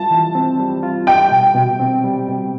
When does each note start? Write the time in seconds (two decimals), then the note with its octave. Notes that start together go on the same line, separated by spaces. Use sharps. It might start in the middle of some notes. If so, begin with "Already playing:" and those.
Already playing: G3 F4 A5
0.11 E3
0.35 C4
0.59 G3
0.83 F4
1.07 G3 G5
1.31 B2
1.55 B2
1.80 C4
2.04 G3
2.28 B2